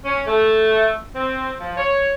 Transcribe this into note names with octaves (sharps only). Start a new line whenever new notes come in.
C#4
A3
C4
F3
C#5